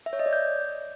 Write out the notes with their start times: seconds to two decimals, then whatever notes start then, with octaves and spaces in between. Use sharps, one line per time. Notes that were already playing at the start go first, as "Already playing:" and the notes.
0.06 E5
0.13 C#5
0.19 D#5
0.26 D5
0.33 G6